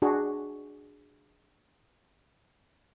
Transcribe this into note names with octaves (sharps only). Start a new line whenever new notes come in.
D4 F#4 G#4